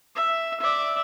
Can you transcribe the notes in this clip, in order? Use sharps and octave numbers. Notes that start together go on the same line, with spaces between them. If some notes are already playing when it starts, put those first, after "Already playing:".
E5
D5 E5